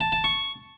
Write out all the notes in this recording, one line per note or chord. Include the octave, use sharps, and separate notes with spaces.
A5
A5
C#6